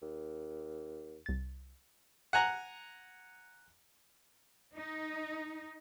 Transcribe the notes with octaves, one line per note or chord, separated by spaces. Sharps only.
D#2
C2 A6
F#5 G#5 A#5 F#6
D#4